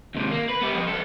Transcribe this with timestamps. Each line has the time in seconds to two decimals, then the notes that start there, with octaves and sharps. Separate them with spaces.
0.15 D#2 C3
0.31 A#3
0.49 B4
0.61 B3 G4
0.74 F3 D#5
0.87 C2 A4